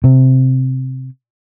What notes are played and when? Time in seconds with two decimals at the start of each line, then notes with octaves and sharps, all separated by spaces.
0.04 C3